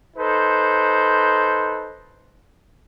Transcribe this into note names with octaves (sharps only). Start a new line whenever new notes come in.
D#4 A4 B4 C5